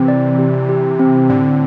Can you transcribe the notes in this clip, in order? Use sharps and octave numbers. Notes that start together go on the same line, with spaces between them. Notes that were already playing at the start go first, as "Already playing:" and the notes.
Already playing: C3 E3 C4
D5
G4
G4
C4
A2 D3 D5